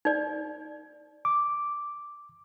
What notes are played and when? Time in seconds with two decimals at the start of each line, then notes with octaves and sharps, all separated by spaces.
0.05 D#4 D5
1.25 D6